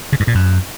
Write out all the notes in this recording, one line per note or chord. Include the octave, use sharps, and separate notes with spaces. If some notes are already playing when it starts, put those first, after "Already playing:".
C#3
G2
A#2
F#2